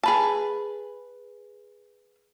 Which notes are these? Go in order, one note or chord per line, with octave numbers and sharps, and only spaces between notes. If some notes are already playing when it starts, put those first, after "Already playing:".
G#4 B4 A5